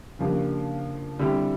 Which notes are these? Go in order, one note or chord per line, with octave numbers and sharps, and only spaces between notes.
C#3 F3 A#3 D4 G4
D3 G3 C4 E4 G4